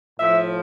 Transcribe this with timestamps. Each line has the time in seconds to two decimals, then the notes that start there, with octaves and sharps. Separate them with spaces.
0.19 A2 F3 E5